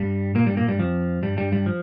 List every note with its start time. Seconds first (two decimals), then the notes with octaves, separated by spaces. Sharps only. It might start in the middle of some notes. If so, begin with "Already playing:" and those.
Already playing: G2 G3
0.35 A#2 A#3
0.46 G2 G3
0.57 A#2 A#3
0.68 G2 G3
0.79 F2 F3
1.23 G2 G3
1.37 G2 G3
1.52 G2 G3
1.66 F3